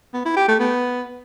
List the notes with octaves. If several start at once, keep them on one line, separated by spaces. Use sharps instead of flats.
B3
E4
G4
A3
B3